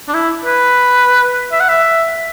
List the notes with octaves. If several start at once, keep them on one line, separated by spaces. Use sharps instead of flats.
D4
E4
B4
E5
F#5
E5